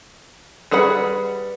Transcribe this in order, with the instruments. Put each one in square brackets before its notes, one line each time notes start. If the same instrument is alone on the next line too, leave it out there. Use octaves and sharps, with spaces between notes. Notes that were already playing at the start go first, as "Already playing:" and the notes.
[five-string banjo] G3 G#4 B4 F#5 B5